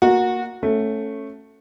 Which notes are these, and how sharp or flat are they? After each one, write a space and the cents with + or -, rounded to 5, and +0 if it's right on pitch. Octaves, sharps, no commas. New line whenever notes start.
A#3 +0 F#4 -20
A3 +0 C#4 -15